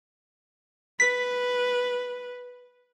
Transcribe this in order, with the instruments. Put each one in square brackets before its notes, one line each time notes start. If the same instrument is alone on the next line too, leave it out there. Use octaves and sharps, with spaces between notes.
[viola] B4 [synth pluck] B6